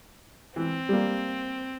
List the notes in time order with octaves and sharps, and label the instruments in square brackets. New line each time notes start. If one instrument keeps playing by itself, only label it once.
[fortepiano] E3 [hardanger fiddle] C4
[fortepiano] G3 A#3